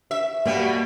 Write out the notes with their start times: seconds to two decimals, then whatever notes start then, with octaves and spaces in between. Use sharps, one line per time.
0.11 E5
0.45 B2 G3 A#3